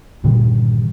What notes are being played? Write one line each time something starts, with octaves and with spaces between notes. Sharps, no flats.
G2 A#2 D3 D#3